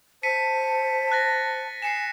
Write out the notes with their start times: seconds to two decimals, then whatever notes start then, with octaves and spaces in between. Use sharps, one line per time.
0.23 C5 A5 B6 C#7 D#7
1.12 F#6 A6 A#6
1.82 G#5 C7 C#7 E7